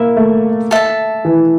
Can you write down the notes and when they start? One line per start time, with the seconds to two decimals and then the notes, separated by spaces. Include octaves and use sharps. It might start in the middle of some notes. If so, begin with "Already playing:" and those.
Already playing: A#3 E4 E5
0.17 A3
0.71 A4 E5 A5
1.25 E3